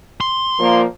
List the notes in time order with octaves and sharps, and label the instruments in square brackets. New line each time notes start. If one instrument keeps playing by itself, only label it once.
[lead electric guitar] C6
[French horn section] A#2 F3 A#3